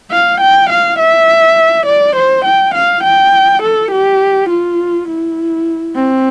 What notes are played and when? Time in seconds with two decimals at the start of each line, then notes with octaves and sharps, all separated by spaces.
0.11 F5
0.40 G5
0.69 F5
0.99 E5
1.86 D5
2.16 C5
2.45 G5
2.74 F5
3.03 G5
3.62 A4
3.91 G4
4.49 F4
5.08 E4
5.95 C4